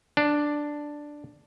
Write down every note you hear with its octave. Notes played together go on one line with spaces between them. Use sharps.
D4